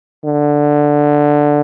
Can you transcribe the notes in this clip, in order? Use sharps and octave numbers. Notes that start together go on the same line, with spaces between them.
D3